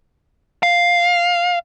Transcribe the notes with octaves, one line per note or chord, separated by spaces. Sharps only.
F5